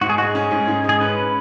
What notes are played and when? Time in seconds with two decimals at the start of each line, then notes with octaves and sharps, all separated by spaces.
0.01 G#2 F#4
0.09 G#4
0.18 G#3 F#4
0.27 G#4
0.35 C#4
0.51 G#2
0.67 G#2
0.84 G#3 G#4
1.01 C#4 B4